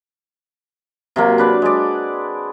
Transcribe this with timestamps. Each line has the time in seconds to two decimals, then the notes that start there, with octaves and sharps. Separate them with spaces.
1.16 C3 F#3 A#3
1.38 D4 B4 D5
1.62 G#3 D5